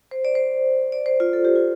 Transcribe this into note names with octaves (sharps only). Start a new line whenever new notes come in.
C5
D5
C5
D5
C5
F4
A4
G4
F4